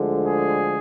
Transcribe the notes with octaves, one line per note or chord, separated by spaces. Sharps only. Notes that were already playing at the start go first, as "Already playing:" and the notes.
Already playing: D2 D3 F3 G#3
G#4